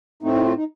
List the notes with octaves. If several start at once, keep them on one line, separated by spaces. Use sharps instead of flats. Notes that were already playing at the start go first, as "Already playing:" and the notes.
A2 A3 C4 D#4
D#4
F4
D#4